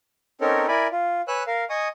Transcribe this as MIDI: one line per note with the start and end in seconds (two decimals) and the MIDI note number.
0.41 0.67 60
0.41 0.67 61
0.41 0.67 63
0.41 0.67 69
0.41 0.67 70
0.41 0.67 73
0.68 0.87 64
0.68 0.87 70
0.68 0.87 74
0.68 0.87 80
0.68 0.87 83
0.92 1.21 65
1.28 1.43 71
1.28 1.43 73
1.28 1.43 80
1.28 1.43 88
1.28 1.43 90
1.47 1.64 70
1.47 1.64 77
1.70 1.88 75
1.70 1.88 80
1.70 1.88 85
1.70 1.88 87